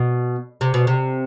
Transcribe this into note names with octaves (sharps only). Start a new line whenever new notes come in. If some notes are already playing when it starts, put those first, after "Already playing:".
Already playing: B2
C3
B2
C3